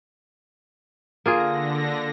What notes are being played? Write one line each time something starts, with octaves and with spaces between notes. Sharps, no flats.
D3 A#3 F4 G#4 A#6